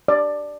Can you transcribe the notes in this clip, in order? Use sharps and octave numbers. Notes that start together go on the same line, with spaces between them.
D5